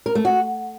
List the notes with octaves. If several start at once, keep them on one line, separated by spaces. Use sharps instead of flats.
A#4
A3
F#4